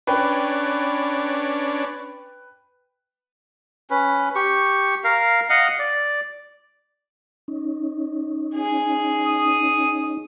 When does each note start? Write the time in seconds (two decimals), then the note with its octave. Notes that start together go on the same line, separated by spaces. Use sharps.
0.07 C#4 D4 B4 G5
3.90 C#4 B4
4.35 G4 C#6
5.04 A#4 F5
5.50 D#5 F5 F#5
5.79 D5
7.48 C#4 D#4
8.55 G#4
9.26 D#6